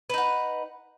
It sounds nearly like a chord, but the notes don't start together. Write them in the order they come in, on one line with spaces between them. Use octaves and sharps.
B4 D#4 F#5